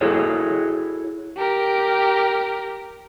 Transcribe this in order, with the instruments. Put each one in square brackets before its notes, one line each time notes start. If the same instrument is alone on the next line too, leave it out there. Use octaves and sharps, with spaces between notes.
[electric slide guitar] E4 F#4 G#4 A4 C#5
[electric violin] G4 A#4